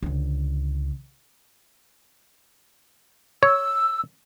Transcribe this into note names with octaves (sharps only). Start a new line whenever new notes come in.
C#2 D3
C#5 E6